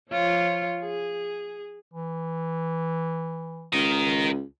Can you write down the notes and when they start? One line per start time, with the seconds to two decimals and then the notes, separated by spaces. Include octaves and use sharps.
0.10 F3 F4 C#5
0.81 G#4
1.93 E3
3.73 C#2 A#4 D#5